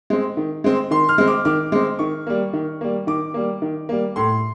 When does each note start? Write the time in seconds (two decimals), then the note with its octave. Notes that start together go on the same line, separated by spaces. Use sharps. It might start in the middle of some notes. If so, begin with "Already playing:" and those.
0.10 G#3 C4
0.37 D#3
0.64 G#3 C4
0.91 D#3 C6
1.09 F6
1.18 G#3 C4
1.28 D6
1.45 D#3 D6
1.72 G#3 C4
1.99 D#3 C#6
2.27 G3 A#3
2.53 D#3
2.81 G3 A#3
3.07 D#3 D6
3.34 G3 A#3
3.62 D#3
3.89 G3 A#3
4.16 A2 C6